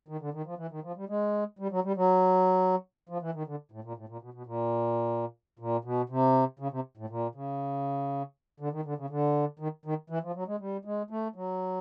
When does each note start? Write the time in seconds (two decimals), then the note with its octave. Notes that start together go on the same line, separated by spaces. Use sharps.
0.08 D#3
0.21 D3
0.33 D#3
0.46 F3
0.58 E3
0.71 D#3
0.84 F3
0.96 G3
1.09 G#3
1.59 G3
1.71 F#3
1.84 G3
1.96 F#3
3.09 F3
3.22 E3
3.34 D#3
3.47 D3
3.72 A2
3.84 A#2
3.97 A2
4.09 A#2
4.22 B2
4.34 B2
4.46 A#2
5.59 A#2
5.84 B2
6.09 C3
6.59 C#3
6.72 C3
6.97 A2
7.10 A#2
7.35 C#3
8.60 D3
8.72 D#3
8.85 D3
8.97 C#3
9.10 D3
9.59 D#3
9.86 D#3
10.10 E3
10.23 F3
10.35 F#3
10.47 G#3
10.60 G3
10.85 G#3
11.10 A3
11.35 F#3